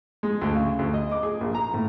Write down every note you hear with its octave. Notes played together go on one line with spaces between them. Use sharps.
G#3
D2
C#3
D2
D#5
D6
G#4
A#1
A#5
A2